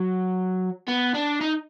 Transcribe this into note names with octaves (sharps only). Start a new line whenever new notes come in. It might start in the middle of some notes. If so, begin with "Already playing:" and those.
Already playing: F#3
B3
D4
D#4